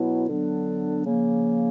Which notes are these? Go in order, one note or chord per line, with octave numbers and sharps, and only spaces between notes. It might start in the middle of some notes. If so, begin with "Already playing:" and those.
Already playing: B2 F#3 B3 E4
D3 F#3 B3 D4
C#3 F3 A#3